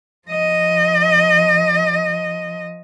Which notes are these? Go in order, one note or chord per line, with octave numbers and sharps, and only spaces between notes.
F3 D#5